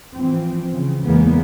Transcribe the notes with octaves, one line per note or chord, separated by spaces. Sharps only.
E3 F3 C4
C#3
E2 C#3 E3 G#3 A#3 B3